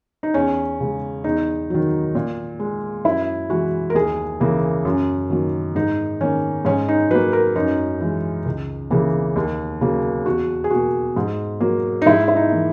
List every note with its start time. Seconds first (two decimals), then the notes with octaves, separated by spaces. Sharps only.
0.23 D#4
0.34 E2 C#4
0.80 C#3 G#3
1.24 E2 D#4
1.70 D#3 F#3
2.15 A#2
2.60 G#3
3.04 F#2 E4
3.50 E3 G#3 F#4
3.90 A#4
3.95 D#2 G#4
4.40 C#3 E3 A#3
4.85 F#2
5.30 D#3 F#3 A#3
5.75 G#2 D#4
6.20 D#3 A#3 C#4
6.65 G#2 C#4
6.88 D#4
7.10 F#3 B4
7.15 A#3
7.33 A#4
7.56 F#2 D#4
8.00 E3 G#3
8.46 C#2
8.91 C#3 E3 A#3
9.36 D#2
9.81 C#3 F#3 A#3
10.26 E2 F#4
10.64 G#4
10.70 B2 A#3 F#4
11.16 G#2
11.61 F#3 A#3
12.02 D#4
12.06 G#2 E4
12.28 E4
12.36 D#4
12.51 E3 A#3